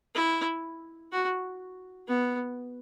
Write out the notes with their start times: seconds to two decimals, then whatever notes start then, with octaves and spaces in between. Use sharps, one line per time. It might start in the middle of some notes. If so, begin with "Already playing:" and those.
0.15 E4
1.12 F#4
2.08 B3